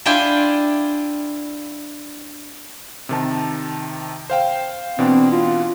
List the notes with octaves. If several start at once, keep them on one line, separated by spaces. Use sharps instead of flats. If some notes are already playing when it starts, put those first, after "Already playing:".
D4 E4 F4 G5 G#5
C3 D#3 A5
C5 F5 G5
B2 E3 C4 D4
F4